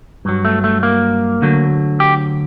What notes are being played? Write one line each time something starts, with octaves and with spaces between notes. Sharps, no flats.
G2 F#3
A3
A3
A#3
D2 D3 F#3
G4